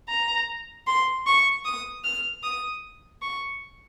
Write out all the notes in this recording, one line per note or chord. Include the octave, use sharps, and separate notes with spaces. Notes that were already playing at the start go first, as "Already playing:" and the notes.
A#5
C6
C#6
D#6
F6
D#6
C#6